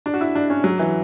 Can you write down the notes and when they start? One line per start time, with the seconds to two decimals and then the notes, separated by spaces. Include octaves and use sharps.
0.06 D4
0.14 F#4
0.21 E4
0.35 D4
0.50 C#4
0.64 F#3
0.79 E3